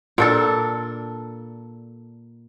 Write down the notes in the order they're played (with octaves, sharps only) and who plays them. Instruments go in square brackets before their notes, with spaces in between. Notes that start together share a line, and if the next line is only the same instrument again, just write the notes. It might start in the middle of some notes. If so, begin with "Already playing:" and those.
[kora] A#2 D4 A4